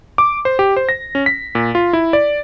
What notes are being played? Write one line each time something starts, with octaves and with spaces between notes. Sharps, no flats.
D6
C5
G4
C5
A#6
C#4
B6
A#2
F4
E4
D5